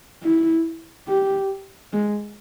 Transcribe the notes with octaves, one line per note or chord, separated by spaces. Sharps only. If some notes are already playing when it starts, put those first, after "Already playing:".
E4
G4
G#3